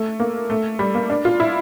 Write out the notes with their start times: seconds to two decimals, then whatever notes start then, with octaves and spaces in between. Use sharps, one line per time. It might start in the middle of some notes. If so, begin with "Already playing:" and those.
Already playing: A3
0.20 A#3
0.50 A3
0.79 G3
0.95 A#3
1.10 D4
1.25 F4
1.40 E4